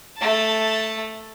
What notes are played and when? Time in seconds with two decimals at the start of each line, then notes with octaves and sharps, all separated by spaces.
0.18 A3 A5